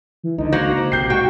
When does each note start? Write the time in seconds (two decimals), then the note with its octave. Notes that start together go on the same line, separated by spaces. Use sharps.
0.24 E3
0.38 C#2 D3 D#4
0.52 A#3 F#4 C5 A#5
0.92 B1 C3 G4 G6 C7
1.10 G#2 F#4 G5 C#6